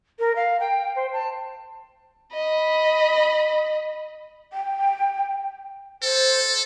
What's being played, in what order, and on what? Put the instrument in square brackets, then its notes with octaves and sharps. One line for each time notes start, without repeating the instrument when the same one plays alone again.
[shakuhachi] A#4
F5
G5
C5
A5
[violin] D#5 B5
[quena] G5
[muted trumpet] A4 [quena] C5